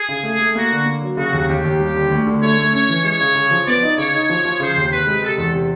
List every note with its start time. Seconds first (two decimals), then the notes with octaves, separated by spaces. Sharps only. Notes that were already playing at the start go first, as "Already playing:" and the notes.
Already playing: G#4
0.09 C#3
0.23 A3
0.39 A3
0.55 A#3 F#4
0.71 D3
0.86 A#3
1.02 F#3
1.17 C#3 F#4
1.33 D#2
1.48 D#2 G4
1.64 D#2
1.80 G3
1.95 D3
2.12 D2
2.27 D3
2.42 A3 C#5
2.58 A3
2.73 C#4 C#5
2.89 E3
3.04 G#3 C#5
3.21 C#3
3.35 C#3
3.51 F3
3.67 B3 D5
3.83 D#4
3.98 C#3 C#5
4.14 D#4
4.29 F3 C#5
4.45 F3
4.60 C#3 C5
4.76 D#2
4.92 C3 B4
5.07 G#3
5.23 C3 A4
5.38 E2
5.54 C3